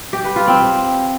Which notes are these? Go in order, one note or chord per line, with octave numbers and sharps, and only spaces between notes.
G4
B4
F4
C4